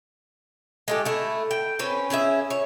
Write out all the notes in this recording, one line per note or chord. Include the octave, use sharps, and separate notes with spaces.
G#3 A3 G4
A3 E4
G5
C4 C#4 B4
C#4 E4 G#4 E5
C#5